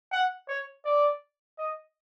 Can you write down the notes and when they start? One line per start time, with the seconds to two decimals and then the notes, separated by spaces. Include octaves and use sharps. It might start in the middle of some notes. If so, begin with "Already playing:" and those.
0.12 F#5
0.48 C#5
0.85 D5
1.58 D#5